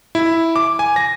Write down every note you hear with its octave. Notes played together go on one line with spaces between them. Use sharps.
E4
D6
G#5
A#6